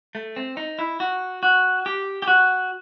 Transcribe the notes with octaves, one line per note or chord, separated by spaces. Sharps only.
A3
C4
D#4
E4
F#4
F#4
G4
G4
F#4